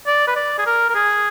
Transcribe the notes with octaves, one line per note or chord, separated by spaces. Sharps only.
D5
B4
D5
G#4
A#4
A#4
G#4